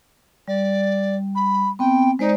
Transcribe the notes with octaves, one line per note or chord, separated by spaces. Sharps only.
G3 D5
B5
B3 C4 G5
G#3 D#4 C5 D5